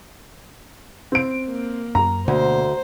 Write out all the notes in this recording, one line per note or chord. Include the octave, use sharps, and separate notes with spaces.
C4 D7
A#3
F#2 A#5
D2 B2 D3 A#3 C5